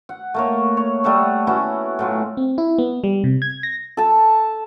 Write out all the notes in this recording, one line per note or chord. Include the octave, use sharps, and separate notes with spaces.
F#5
A3 A#3 C#5
C#5
G3 A3 E5 F#5
B3 C#4 E4 F#4
A2 F#3 F4
C4
E4
B3
G3
C3
G#6
A#6
A4 A5